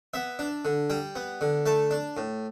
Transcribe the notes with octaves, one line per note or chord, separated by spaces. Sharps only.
B3 E5
D4
D3
G3 G5
B3
D3
A3 A5
D4
A2